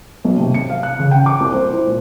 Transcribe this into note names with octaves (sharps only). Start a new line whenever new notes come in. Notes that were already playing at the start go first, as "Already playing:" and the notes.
B1
C3
C#7
F5
F#6
C#3
G5
D6
C2
C5
E4
A#2